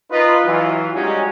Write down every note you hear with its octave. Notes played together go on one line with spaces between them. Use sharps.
D#4 F4 B4
E3 F#3 F4
G3 G#3 C#4 D#4 F#4 G4